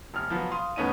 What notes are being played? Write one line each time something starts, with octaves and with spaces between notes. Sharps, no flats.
F1 F6
F3 F#3 B3
F5 C6 D#6
E2 A3 B3 C#4 D#4 D#7